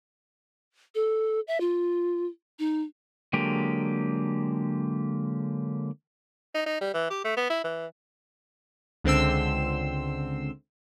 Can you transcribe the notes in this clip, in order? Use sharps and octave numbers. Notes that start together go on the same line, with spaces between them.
A4
E5
F4
D#4
D3 F#3 G#3 A#3 G4
D#4
D#4
G3
E3
G4
A3
B3
E4
E3
C#2 D3 C4 C6 E6